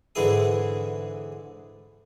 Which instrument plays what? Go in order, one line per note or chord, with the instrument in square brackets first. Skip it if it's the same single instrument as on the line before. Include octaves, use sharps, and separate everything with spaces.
[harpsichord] G#2 D3 E3 E4 G#4 D#6